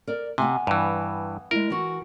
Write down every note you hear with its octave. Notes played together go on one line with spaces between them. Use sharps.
A#4 D5
C3 B3 E5 G#5
G2 E3
G#3 E4 A#4
E3 F#4